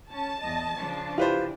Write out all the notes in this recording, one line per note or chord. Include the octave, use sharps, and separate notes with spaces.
C#4 A5
E2 D#5
C#3 F3 D4
E4 F4 G4 B4 C5